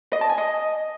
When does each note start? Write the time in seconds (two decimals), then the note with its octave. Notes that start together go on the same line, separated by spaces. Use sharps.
0.13 D#5
0.21 A5
0.30 G#5
0.38 D#5